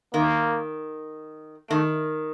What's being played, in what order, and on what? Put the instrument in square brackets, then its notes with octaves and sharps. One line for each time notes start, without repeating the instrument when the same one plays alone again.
[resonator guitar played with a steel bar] D#3 [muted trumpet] A#3
[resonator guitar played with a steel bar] D#3 [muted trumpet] A3